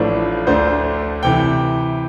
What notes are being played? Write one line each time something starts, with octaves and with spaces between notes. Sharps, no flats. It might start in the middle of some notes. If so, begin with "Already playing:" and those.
Already playing: A1 A2 F3 A3 D4
D2 D3 A3 D4 C5
C3 E3 G5